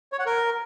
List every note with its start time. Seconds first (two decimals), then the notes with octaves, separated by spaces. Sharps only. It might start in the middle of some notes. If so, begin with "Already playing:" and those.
0.12 C#5
0.19 F#5
0.26 A#4